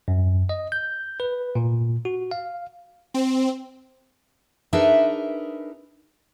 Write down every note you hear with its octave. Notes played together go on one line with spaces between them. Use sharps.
F#2
D#5
G6
B4
A#2
F#4
F5
C4
D4 D#4 G#4 A#4 B4 E5